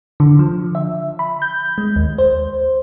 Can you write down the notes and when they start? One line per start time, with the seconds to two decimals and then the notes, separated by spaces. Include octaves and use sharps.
0.20 D3
0.39 F3
0.75 E5
1.19 B5
1.42 G6
1.78 G#3
1.96 D#2
2.18 C5